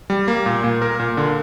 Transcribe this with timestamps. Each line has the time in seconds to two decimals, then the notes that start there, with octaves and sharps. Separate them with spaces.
0.10 G3
0.28 A#3
0.46 A#2
0.64 A#2
0.82 A#4
1.00 A#2
1.17 D3